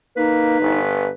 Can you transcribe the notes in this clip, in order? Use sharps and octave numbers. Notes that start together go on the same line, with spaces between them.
A#3 D#4 B4
G1